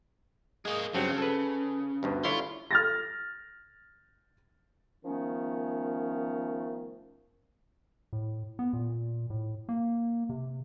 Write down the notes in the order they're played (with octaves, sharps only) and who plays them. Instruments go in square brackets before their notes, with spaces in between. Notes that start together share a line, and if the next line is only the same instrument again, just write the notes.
[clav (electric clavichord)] G#3 [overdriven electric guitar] A#3 G#4
[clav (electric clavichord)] G2 F#3 C4 [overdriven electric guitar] C#3
[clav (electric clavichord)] A4 B4
D2 G2 B2
[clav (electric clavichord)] D3 E4 C#5 [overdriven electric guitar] F4
[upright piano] F6 A6 A#6
[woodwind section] D#3 F3 A3 B3 C#4
[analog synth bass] A2
B3
A#2
A2
A#3
C3